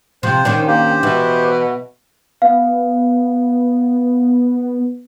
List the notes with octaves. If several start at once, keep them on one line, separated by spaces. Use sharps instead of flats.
C3 F3 C5
D#3 C#4 D4
A#3 G4 C5
B2 E3
B3 F5